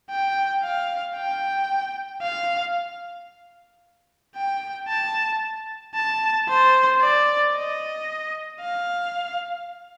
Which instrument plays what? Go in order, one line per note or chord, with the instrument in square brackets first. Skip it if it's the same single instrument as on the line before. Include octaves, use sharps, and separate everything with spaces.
[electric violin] G5
F5
G5
F5
G5
A5
A5
C5
D5
D#5
F5